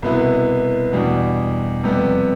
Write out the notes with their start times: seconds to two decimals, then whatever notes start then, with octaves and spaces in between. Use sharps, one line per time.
0.02 C2 B2 B3 E4
0.93 E2 B2 G3 D4
1.84 F2 C3 G3 B3